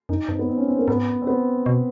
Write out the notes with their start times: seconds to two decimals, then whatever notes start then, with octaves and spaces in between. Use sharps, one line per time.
0.09 F#2 D#4
0.29 G2 C4
0.39 B3
0.49 C4
0.58 C#4
0.68 C4
0.79 A#3
0.88 G#2 B3
1.22 C4
1.27 B3
1.66 B2